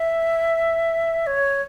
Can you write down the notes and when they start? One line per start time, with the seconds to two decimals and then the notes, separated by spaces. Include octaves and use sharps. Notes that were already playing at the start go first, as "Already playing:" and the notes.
Already playing: E5
1.27 C#5